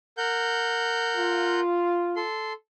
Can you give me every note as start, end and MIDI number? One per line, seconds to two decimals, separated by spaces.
0.18 1.60 70
0.18 1.60 78
0.18 1.60 91
1.15 2.22 65
2.16 2.53 69
2.16 2.53 84